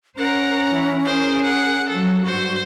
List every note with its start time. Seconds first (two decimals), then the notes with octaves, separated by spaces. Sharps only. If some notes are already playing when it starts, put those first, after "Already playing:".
0.17 C#4 A#4 C5 F#5 A#5
0.71 E3 E4
1.05 G#4 A#4 C5
1.44 F#5
1.88 F3 F#3 A4
2.24 G2 F#4 C5